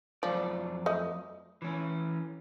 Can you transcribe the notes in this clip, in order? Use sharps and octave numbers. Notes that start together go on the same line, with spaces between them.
F2 F3 F#3 D5
A3 D#5
E3 C#4